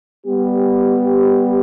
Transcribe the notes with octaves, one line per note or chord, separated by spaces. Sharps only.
G3 B3 G4